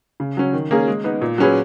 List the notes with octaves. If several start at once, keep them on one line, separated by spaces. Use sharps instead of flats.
C#3
F#3 C#4
D#3
A#3 C#4 G#4
G#3
B3 D#4
A#2
F#3 C#4 G#4 B4